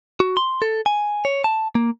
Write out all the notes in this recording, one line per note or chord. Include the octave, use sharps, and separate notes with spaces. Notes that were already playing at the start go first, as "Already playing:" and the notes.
F#4
C6
A4
G#5
C#5
A5
A#3